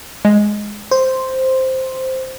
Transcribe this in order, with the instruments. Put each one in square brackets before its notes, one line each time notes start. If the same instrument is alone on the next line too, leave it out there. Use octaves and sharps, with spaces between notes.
[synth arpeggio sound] G#3
[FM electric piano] C5